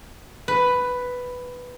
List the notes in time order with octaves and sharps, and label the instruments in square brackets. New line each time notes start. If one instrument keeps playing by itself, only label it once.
[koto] B4